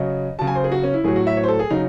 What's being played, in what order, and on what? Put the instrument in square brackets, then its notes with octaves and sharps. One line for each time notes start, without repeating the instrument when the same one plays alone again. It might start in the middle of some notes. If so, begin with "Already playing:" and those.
Already playing: [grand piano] C#3 F#3 D#5
C#3 F#3 A5
G#5
C5
G#4
F#4
C#4
E4
A2 F#3 G#4
F#4
E5
C#5
C5
A4
G#4
C#3 F#3 D#4